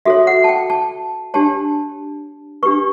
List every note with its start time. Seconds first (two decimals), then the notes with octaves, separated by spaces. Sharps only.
0.05 F#4 A4 C#5 E5
0.27 F#5
0.44 A5
0.49 G5
0.70 A5
1.34 D4 G4 C#5 A5
2.63 D4 G4 B4 C#6